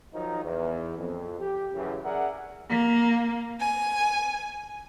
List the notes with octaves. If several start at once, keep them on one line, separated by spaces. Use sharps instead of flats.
D#3 F3 F#3 D#4
E2
F2
G4
F#2 C#3 E3
G#4 A#4 D5 E5 F#5
A#3
G#5